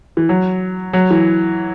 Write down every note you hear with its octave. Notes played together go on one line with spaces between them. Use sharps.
E3
F#3
F#3
E3